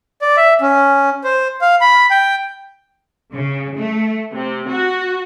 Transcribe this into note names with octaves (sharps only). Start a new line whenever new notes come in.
D5
E5
C#4
C5
F5
B5
G5
C#3
A3
C3
F#4